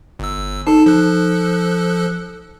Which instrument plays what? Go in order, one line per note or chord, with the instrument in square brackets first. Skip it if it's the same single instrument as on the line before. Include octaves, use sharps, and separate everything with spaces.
[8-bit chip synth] G1 E6
[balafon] D#4 [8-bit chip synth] A4 A5
[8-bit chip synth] F3 A4 F#6